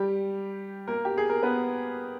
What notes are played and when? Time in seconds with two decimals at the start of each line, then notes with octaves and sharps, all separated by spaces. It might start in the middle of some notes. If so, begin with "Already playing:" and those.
Already playing: G3 G4
0.88 A#3 A#4
1.05 G4
1.18 G#4
1.30 A#4
1.43 B3 B4